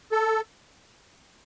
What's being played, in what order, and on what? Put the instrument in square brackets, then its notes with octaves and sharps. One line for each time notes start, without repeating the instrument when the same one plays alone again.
[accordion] A4